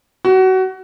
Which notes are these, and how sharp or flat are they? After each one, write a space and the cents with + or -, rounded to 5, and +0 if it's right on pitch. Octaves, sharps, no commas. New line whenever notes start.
F#4 +25